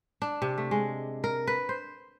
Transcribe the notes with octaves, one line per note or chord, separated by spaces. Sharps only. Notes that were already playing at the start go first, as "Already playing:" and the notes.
D4
C3
A3
G#3
A#4
B4
C5